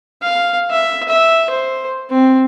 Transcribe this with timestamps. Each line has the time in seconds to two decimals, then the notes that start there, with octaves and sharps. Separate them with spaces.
0.23 F5
0.70 E5
1.09 E5
1.50 C5
2.10 C4